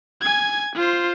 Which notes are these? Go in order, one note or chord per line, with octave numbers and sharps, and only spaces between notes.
G#5 G#6
F4 C5